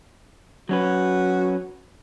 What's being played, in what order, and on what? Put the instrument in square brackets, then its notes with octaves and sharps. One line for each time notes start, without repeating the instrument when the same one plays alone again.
[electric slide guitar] F#3 C#4 B4 [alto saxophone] F#4